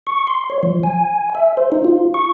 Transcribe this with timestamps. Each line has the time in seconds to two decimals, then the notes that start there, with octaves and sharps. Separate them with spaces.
0.07 C#6
0.27 C6
0.50 C#5
0.63 F3
0.83 G#5
1.35 E5
1.57 C5
1.72 D#4
1.85 F4
2.14 C#6